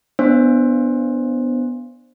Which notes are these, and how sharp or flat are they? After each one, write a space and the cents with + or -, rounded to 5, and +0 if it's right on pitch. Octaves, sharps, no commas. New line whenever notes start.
B3 +0 D4 +0 C5 +15